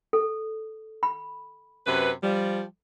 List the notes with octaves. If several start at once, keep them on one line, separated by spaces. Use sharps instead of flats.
A4
B5
F#2 C3 B4
F3 G3